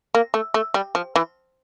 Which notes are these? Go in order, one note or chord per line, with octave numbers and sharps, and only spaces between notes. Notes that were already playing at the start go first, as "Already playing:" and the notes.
A#3
A3
A3
G3
F3
E3